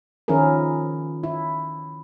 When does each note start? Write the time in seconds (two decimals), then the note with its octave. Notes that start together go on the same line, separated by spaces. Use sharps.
0.28 D#3 F3 C#4 E4 G#4 A#4
1.23 E4